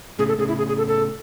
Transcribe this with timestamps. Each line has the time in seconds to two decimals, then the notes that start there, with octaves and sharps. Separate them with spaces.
0.19 A2 C#3 G#4
0.28 A4
0.38 A2 C#3 G#4
0.48 E4
0.58 G#4
0.68 G#4
0.78 A4
0.88 A4